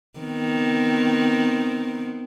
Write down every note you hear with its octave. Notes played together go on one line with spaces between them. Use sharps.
D#3 B3 C4